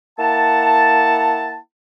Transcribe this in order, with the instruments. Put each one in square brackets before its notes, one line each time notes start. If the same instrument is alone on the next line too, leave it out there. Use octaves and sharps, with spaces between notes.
[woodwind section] A#3 E4 F#5 A5